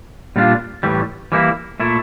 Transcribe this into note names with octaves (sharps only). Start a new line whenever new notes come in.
A#2 G3 D4 F4
A2 E3 G3
E3 G3 A#3 E4
A#2 A3 E4